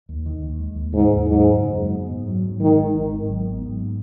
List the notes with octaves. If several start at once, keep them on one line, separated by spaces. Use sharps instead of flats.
D#2
D#3
D#2
G#3
D#2
G#2 C#3
D#2
G#2 F#3
F#2
C#3
F#2
B3
G#2
F#3
G#2
D#3 G#3
G#1
G#2
G#1
F#3
B3
G#2